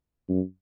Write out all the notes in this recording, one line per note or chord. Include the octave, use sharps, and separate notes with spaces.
F#2